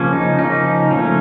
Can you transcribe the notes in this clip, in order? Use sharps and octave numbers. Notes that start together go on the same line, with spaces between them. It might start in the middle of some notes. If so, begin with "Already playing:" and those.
Already playing: C#3 F3 A#3 C#4
D#4
C#3 F3 A#3 C#4 D#4
F3 A3 C#4